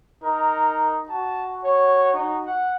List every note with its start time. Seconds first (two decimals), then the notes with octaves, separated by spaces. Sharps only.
0.23 D#4 A#4
1.09 F#4 A5
1.64 C#5
2.13 D#4
2.45 F#5